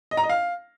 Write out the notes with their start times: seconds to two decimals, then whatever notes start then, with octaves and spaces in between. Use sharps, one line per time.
0.11 D#5
0.17 A#5
0.23 D#5
0.29 F5